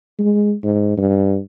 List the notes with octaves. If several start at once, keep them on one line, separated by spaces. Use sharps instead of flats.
G#3
G#2
G2